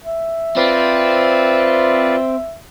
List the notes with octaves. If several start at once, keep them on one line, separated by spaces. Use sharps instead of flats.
E5
C4 F4 B4 D5